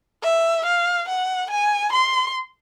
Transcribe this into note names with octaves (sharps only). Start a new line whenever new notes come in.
E5
F5
F#5
G#5
C6